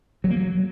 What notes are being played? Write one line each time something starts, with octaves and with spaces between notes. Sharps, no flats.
F#3
A#3
F#3